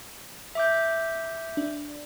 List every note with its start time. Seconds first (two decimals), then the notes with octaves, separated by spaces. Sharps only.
0.55 E5 D6 G6
1.57 D4